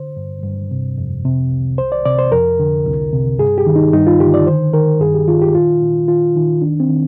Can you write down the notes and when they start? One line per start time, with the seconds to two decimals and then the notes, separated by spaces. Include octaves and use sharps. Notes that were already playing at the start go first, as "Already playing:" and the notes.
Already playing: D3 C5
0.17 G2
0.43 G2
0.71 C3
0.98 F2
1.25 C3
1.51 C2
1.78 C2 C5
1.92 D5
2.05 C3 D5
2.19 C5
2.32 F2 A#4
2.60 D3
2.86 C2
3.13 C3
3.39 G2 G#4
3.58 G4
3.67 D#3
3.76 D#4
3.93 G2 D#4
4.07 F4
4.20 D3 G4
4.34 D5
4.47 D#3 C5
4.74 D#3 A#4
5.00 G2 G#4
5.14 G4
5.28 D#3 F4
5.42 G4
5.55 A#2 F4
5.81 A#2
6.08 D#3 F4
6.36 D#3 D#4
6.62 D#3 D4
6.80 C4
6.89 D#3